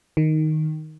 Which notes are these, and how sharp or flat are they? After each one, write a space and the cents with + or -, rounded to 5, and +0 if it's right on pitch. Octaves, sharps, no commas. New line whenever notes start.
D#3 +0